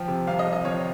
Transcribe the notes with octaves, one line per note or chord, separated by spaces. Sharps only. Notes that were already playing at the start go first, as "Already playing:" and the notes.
Already playing: F3 G5
C3
C2 F5
D#5
C2
D#5
F3 C#5